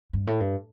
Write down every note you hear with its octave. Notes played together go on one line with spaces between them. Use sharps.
G2
A2
G2